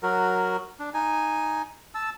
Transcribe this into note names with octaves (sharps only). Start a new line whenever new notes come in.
F#3 F#4 A#4
D4
D#4 G#5
A5 E6